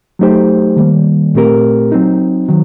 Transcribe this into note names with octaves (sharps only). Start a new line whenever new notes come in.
F#3 A3 D#4 G4 C5
D#3 G3 A#3
A#2 A3 C4 G4 A#4
F#3 C4 D#4
D#3 F#3